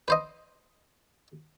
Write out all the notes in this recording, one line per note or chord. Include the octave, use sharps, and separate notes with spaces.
B4 C5 D#5